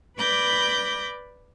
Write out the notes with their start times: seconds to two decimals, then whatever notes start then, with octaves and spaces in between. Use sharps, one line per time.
0.17 B4 D5 B5 D6 G6 A#6